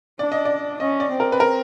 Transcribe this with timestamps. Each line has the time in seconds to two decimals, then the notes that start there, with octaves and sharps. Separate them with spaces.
0.19 D4 D5
0.32 D#5
0.45 D5
0.80 C#4 D#5
1.00 D5
1.10 C4
1.20 A#4
1.32 B4
1.40 A#4